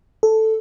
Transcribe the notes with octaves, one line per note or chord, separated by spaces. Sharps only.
A4